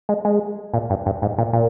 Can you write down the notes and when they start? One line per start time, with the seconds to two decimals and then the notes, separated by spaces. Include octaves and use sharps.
0.09 G#3
0.25 G#3
0.74 A#2
0.90 G2
1.06 G2
1.22 G#2
1.38 A#2
1.53 A#2